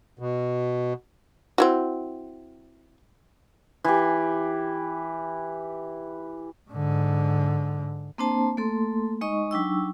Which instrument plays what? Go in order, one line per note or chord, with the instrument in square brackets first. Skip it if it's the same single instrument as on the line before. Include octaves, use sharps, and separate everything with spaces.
[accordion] B2
[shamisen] C4 E4 F#4
[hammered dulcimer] E3 G4
[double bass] G#2 D3
[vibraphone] A#3 C4 D4 C5 A5
A3 A#3 A4 C6
G#3 D#4 D#5 C#6
F#3 D4 D#4 G5 C#6 E6